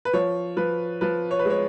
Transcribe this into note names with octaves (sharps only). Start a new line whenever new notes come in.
B4
F3 C#5
F3 B4
F3 B4
C#5
B4
G#3
C#5